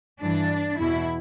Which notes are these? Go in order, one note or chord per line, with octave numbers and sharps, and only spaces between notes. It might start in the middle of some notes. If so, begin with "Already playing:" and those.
G2 E3 D4
E2 B2 E4